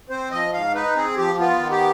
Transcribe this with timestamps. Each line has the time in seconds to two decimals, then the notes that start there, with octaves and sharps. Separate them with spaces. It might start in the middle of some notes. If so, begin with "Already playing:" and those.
0.09 C4 C5
0.31 F3 D#5
0.53 G#2 F5
0.74 D#4 B4
0.95 C4 G#4
1.17 F3 G4
1.39 B3 F4
1.60 D#3
1.71 G4